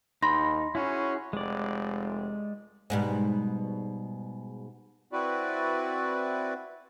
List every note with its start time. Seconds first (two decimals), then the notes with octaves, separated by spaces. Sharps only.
0.22 D#2 D#4 B5 C6 A#6
0.75 C#4 E4 F#4 G#4
1.33 F1 G#3 D5
2.90 G#2 B2 G3
5.12 C4 E4 F#4 B4 D5